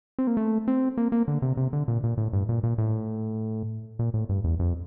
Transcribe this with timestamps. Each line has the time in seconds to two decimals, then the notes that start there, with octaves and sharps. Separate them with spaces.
0.19 C4
0.27 A#3
0.37 A3
0.68 C4
0.98 A#3
1.12 A#3
1.28 D3
1.42 C3
1.57 C3
1.73 D3
1.88 A#2
2.04 A#2
2.18 A2
2.33 G2
2.49 A#2
2.63 A#2
2.78 A2
3.99 A#2
4.14 A2
4.29 G2
4.44 E2
4.59 F2